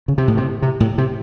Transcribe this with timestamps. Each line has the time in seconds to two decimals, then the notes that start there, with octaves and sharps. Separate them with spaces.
0.08 C#3
0.18 C3
0.28 A2
0.37 C3
0.62 C3
0.80 A2
0.98 C3